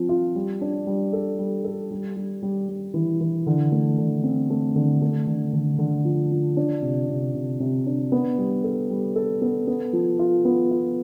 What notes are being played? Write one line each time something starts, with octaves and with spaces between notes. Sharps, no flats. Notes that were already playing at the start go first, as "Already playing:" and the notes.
Already playing: F3 C4
F4
G3
D4
G3
A4
G3
A4
G3
G3
G3
G3
E3
E3
D3
A3
D3
C4
A3
D3
A3
D3
D3
D3
F3
F3
D4
C3
C3
C3
C3
D4
B3
G3
A4
G3
A4
B3
B3
F3
F4
B3
F4